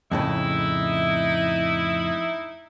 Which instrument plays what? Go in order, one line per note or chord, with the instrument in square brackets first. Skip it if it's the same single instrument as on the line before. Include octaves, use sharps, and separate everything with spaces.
[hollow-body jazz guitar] F2 A2 C#3 [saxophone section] D#4 E4